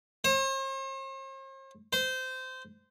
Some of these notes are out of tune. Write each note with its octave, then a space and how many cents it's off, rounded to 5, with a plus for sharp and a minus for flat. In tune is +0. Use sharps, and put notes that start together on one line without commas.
C5 +45
C5 -20